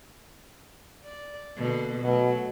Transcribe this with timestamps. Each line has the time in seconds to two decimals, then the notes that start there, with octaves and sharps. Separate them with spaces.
1.04 D5
1.56 B2 D3 A#3
2.03 B2 F#3 A3